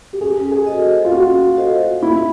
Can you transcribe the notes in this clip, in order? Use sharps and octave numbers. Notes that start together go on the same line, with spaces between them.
G4
C#4 G#4
G#4
F#4 A4 C5 D#5
F4
C#4 F#4
F#4 A4 C5 D#5
D#4 E4